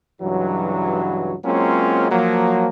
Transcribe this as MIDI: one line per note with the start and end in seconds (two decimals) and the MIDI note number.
0.22 1.34 37
0.22 1.34 43
0.22 1.34 52
0.22 1.34 54
1.44 2.09 54
1.44 2.09 56
1.44 2.09 58
1.44 2.09 60
1.44 2.09 61
1.44 2.09 65
2.11 2.68 53
2.11 2.68 54
2.11 2.68 58